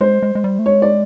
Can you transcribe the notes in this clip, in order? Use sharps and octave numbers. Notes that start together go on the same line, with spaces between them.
G#3 C5
G#3
G#3
G3
A3
G#3 C#5
D5